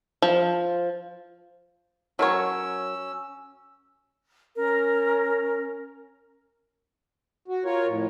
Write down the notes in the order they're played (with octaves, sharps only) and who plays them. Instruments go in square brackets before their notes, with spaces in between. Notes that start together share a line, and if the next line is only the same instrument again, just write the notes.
[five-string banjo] F3
[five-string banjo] F#3 A#4 C#5 [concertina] C#4 E6
[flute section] C#4 A#4
[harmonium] F#4
F4 A#4 C#5
F2 A2